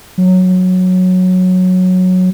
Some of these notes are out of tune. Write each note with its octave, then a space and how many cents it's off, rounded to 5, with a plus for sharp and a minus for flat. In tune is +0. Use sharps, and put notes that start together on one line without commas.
F#3 -10